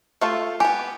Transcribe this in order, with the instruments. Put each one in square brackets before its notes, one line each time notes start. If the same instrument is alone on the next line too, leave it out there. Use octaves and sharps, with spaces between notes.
[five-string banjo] A3 F4 A4
[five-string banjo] B3 G4 [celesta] G#5